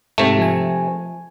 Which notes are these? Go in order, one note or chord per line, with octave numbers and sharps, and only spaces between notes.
G#2 C3 A3
F3 G#5